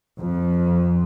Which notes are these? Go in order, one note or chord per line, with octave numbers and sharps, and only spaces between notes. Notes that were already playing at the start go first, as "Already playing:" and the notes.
F2